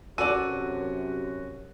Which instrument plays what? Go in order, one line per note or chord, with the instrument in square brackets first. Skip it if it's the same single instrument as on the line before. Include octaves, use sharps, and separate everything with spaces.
[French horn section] F#2 C3 F#3 [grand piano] F#4 D#7 [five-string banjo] A4 D5